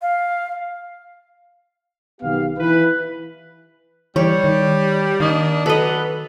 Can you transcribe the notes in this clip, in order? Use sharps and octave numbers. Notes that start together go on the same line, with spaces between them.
F5
B1 D#3 B3 G4 F5
E3 B4
E3 G3 C#5
D#3
D#3 A#3 D4 D#5
F#3 A4 B4 D#5